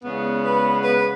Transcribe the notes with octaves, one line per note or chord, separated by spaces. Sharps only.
E2 C#3 G#3 B3
B4
B4